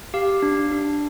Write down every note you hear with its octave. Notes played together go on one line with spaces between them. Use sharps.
G4 F5
D4
D4